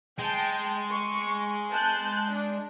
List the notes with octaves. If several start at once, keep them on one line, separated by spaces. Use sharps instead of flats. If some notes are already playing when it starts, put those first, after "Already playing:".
G#3 G5 A5
C#6
A5 F#6 G6
D4